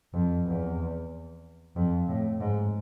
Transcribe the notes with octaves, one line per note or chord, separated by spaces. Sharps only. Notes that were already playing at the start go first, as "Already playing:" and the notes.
F2
E2
F2
A2
G#2